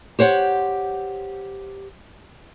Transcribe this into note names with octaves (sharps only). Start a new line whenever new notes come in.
G4 C5 C#5 F#5